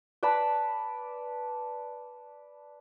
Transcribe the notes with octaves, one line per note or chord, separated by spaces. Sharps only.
B4 D5 A5 B5